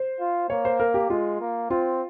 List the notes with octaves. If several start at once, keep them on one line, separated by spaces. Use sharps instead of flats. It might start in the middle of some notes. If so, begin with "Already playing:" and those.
Already playing: C5
F4
A#3 C#5
C5
A#4
G4
G#3 F4
A#3
C4 F4